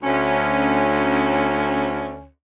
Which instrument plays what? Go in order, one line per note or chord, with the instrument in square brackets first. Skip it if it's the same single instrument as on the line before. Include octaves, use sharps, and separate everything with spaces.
[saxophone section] D2 C#4